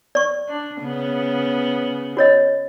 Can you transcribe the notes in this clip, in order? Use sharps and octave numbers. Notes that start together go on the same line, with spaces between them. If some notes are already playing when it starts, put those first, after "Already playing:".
D5 C#6
D4
C#3 B3
F#4 C#5 D#5